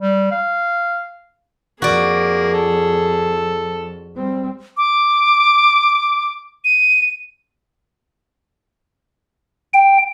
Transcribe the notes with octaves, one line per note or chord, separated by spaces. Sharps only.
G3
F5
F2 F3 A#3 F#4 G#4 D5
A4
G3 C4
D6
D#7
G5